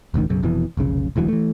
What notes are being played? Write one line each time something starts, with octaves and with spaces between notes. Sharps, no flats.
E1 A1 D2 D#3
B1 F#2 C#3
F1 F2 B2 E3
F1 B1 C#3
E1 D2 E3 F#3
E3 A3